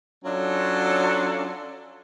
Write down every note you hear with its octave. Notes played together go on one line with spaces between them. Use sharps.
F#3 C#4 D4 F4 A4